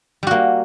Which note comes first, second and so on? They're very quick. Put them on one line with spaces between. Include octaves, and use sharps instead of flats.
G3 F#4 A#3